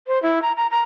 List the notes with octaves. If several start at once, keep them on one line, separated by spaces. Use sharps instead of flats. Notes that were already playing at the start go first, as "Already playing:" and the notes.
C5
E4
A#5
A#5
A#5